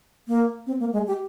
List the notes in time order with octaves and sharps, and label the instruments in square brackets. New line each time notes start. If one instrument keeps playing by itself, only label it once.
[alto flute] A#3
C4
A#3
G#3
G4